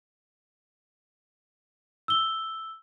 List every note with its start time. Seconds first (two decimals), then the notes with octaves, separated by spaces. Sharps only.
2.08 E6 G7